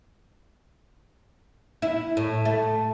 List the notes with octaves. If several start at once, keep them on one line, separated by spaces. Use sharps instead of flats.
E4
A2
A3